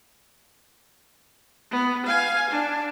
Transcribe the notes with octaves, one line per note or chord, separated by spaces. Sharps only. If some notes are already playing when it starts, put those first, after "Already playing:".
B3
F5 G#5
D4